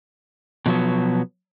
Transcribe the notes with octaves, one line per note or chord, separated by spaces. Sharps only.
B2 F3 F#3 B3